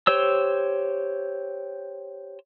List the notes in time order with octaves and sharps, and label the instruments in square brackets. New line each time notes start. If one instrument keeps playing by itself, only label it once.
[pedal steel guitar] G4 C5 C#5 E6